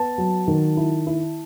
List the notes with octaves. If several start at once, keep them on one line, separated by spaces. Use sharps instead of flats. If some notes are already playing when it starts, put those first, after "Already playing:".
Already playing: B3 A5
F#3
D#3
E4
E4